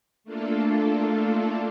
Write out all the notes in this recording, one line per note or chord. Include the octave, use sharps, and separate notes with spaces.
A3 A#3 D4 F4 A4